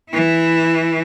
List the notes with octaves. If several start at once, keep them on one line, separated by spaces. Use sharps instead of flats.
E3 E4